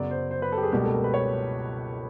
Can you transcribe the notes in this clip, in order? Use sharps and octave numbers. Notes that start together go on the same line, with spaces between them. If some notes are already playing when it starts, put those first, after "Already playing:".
Already playing: F#2 C#3 F#3 B3 D5
C5
C5
B4
A4
G4
G#4
C#2 B2 G3 A#3 G4
A4
A#4
B4
C#5